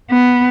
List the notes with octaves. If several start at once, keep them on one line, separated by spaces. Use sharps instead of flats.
B3